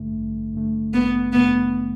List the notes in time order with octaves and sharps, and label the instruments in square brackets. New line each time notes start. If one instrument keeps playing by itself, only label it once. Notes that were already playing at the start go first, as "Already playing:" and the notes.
Already playing: [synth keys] A1 G2 D3 A3
A1
G2 D3 A3
[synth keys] A1 [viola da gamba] B3
[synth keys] G2 D3 A3 [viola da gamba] B3